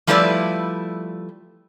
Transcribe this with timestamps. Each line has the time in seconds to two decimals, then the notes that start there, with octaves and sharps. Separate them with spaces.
0.07 F3 G3 A3 E4 B4 D5